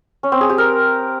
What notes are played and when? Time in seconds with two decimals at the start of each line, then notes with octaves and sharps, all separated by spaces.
0.23 C#4
0.32 C4
0.41 G#4
0.50 G4
0.58 A#4